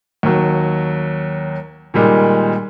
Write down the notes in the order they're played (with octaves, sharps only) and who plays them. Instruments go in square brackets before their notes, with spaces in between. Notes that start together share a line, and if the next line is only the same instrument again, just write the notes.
[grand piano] D#2 F#3
A#2 D#3 G3 G#3